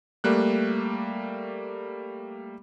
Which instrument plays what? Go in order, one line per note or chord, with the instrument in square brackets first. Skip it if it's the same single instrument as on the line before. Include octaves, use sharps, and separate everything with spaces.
[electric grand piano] G3 A3 A#3 F#6